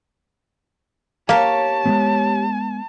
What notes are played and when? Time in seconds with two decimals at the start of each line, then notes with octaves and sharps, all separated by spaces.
1.29 A#3 G4 C#5 A5
1.86 G#3 A3 B3